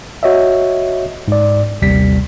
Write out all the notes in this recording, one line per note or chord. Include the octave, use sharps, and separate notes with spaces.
F#4 C#5 D#5 E5
G#2 D5
A1 D#2 C3 G3 B6